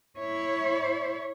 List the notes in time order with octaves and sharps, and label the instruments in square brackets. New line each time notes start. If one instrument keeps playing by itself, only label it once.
[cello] E4 C#5